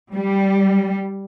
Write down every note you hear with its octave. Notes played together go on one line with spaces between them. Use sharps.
G3